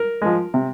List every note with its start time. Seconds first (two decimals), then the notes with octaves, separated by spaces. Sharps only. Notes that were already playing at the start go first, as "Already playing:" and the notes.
Already playing: A#4
0.22 F3 G#3
0.54 C3